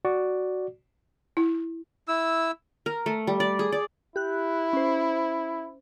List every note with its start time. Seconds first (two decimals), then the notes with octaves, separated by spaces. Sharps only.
0.05 F#4 D5
1.37 E4
2.08 E4 E6
2.86 A#4
3.06 A3
3.27 G3
3.40 D5
3.59 G#4
3.72 D5
4.16 E4 G4 F#6
4.73 C#4 C5